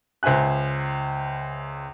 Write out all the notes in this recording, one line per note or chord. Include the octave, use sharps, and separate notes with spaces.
C#2 C5 E5 G#5 F#6